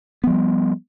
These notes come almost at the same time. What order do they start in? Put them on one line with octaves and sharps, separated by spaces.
B3 F3 G3